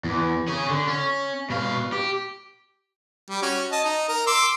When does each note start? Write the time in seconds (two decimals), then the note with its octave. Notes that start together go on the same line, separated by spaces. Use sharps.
0.04 E2
0.48 C#4 G#4
0.70 D3
0.88 C#4
1.50 B2 F5
1.93 G4
3.30 G3
3.42 C#4 F#4
3.72 D#5 A5
3.84 D#4
4.08 A#4 A#5
4.27 C6 D6 E6